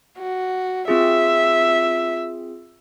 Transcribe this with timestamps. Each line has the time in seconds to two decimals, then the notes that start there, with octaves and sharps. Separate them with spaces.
0.18 F#4
0.88 C4 F4 G#4 E5